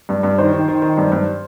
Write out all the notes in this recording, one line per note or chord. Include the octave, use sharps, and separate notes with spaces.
G2
G2
D#3 C5
D#3
D#3
D#3
G2
G2